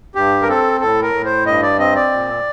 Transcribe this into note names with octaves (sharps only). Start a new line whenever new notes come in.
G2 G4
A#4
C4 A4
A2 A4
A#4
A2
C5
G2 D#5
D5
C4 D#5
D5
A#2